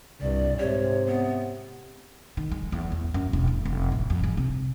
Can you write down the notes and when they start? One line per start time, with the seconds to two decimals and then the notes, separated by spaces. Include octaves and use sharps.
0.21 C2 G2 D5
0.59 G#2 C3 C#5
1.07 B3
2.37 D#3
2.52 G#3
2.72 E2
2.92 E2
3.14 F#2
3.33 E1
3.47 A3
3.66 F1
3.92 A1
4.10 F2
4.24 G#3
4.37 C3